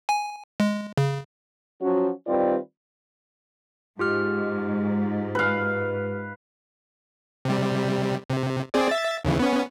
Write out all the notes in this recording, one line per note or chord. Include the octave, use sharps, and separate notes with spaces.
G#5
G#3
C#3
F3 F#3 C#4 F#4
D#3 G3 C4 F4 B4 D5
G#2 F4 G4 F6
B4 F5
C3 G3
C3
C4 G#4 D5
E5 A6
D#2 C#3 E3
B3 C#4